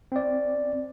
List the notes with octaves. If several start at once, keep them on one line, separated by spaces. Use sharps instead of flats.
C4 D5